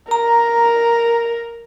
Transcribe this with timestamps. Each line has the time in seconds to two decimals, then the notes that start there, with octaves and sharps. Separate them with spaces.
0.11 A#4 A#5